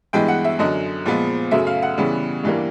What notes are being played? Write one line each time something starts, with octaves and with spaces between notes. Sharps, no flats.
G2 E3 G#3 B3 G5
F#5
E5
F#2 D3 F#3 D#5
A#2 F3 G#3 B3
F#2 C#3 F#3 A3 E5
F5
F#5
C#3 E3 G3 B3
G2 E3 G3 A#3